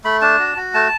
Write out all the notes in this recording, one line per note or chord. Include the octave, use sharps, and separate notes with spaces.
A3 B5
D4 A5
F#4
F#4
A3 A5